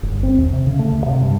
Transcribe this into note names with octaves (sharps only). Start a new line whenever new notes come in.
G1
C4
D#2
C3
C#3
A3
D2
C3
G2